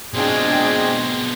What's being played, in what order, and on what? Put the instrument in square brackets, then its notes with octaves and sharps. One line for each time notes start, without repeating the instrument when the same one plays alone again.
[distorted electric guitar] B2 F4 [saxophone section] G#3 C4 [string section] D4 G5 [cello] G#4